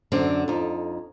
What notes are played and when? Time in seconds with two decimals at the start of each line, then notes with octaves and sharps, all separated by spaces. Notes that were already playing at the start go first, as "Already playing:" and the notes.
0.12 F#2 D3 C4 D5
0.48 F2 D#4